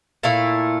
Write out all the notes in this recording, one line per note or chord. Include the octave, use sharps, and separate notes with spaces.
A#2 A3 E4 F5